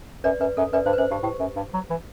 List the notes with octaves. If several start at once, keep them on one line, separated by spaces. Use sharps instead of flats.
F#2 B4 D5
F#2 B4
F#2 A4
F#2 B4 D5
G2 C5
B4
F#2 C5
G2 G4
A2 G4
F#2
G2
F#3
E3